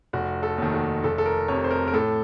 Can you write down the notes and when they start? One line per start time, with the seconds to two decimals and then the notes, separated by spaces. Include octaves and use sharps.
0.13 F1 F#4
0.43 A4
0.58 D#2 D#3
0.74 F#4
1.04 F1 A4
1.18 A4
1.26 A#4
1.48 F2 C3 C#5
1.64 C5
1.71 A#4
1.88 A#4
1.94 A2 A4